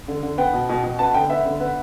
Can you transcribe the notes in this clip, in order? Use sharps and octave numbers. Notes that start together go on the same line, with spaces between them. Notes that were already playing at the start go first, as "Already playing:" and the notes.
D3
D3
B3 G5
B2
B2
B2
B3 A5
D3 G5
B3 E5
D3
B3